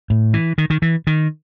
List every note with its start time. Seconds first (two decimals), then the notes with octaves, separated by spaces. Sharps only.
0.10 A2
0.34 E3
0.58 D#3
0.70 D#3
0.82 E3
1.07 D#3